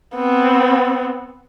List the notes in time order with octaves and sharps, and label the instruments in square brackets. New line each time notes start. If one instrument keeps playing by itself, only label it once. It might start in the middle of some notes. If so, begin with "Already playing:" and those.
[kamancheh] B3 C4